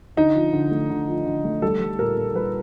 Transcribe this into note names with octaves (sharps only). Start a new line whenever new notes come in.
D3 D#4
F3
D3
A3
D3
F3
D3
A3
G3 A4
G3
A#2 A#4
A#2
G3 B4